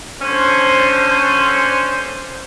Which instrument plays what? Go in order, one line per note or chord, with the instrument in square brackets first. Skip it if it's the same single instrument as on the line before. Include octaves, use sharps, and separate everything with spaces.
[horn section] D3 C#4 [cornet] C5